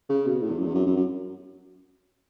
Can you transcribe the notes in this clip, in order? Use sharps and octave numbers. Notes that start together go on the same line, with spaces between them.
C#3
B2
A2
E2
F#2
E2
F#2
F#2
F#2